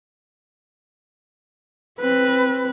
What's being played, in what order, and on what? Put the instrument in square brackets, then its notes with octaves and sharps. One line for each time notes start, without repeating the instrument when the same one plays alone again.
[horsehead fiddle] C4 B4